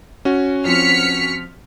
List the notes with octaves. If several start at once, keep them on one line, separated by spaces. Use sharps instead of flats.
C#4 F#4
F3 C4 F6 B6 C#7